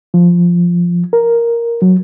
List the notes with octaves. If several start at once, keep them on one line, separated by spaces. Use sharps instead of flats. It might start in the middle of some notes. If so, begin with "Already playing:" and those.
F3
A#4
F#3